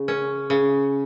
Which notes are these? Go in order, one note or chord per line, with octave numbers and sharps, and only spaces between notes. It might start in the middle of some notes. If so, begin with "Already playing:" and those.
Already playing: C#3
C#4
C#3